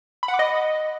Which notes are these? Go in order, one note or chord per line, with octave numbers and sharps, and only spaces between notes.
B5
F#5
D6
D#5